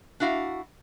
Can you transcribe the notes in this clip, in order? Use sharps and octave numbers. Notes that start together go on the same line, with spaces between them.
D4 E4 F#4 F5